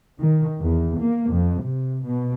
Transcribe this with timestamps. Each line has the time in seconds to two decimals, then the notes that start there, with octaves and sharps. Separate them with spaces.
0.18 D#3
0.60 E2
0.97 A#3
1.30 F2
1.61 C3
2.03 B2